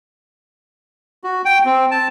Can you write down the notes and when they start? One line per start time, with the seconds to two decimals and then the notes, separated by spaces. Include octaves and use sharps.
1.24 F#4
1.45 G5
1.65 C4
1.91 A5